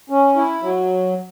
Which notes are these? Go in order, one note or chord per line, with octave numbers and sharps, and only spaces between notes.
C#4
E4
F#3